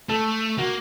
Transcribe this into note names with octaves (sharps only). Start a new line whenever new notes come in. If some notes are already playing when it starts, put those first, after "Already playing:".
A3 A4
A#3 F#4